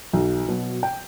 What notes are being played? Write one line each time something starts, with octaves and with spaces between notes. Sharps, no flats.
B1
B2 F#3
G5